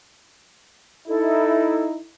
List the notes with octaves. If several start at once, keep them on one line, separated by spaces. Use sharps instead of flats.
D#4 E4 A4